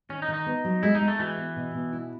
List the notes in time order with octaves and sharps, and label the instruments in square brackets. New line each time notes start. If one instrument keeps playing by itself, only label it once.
[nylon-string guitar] D#3 [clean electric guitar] C#4
[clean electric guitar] D#4
[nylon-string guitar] D#3
[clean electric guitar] D#4
[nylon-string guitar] B3
F#3
[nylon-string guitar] G#3 [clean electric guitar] E4
[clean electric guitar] D#4
[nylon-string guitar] G#3
[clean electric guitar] A3
[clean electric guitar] E3 [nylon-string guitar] F#4
[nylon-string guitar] B3
B2
B2
E4